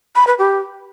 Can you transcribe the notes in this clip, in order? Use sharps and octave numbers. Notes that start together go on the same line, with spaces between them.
B5
B4
G4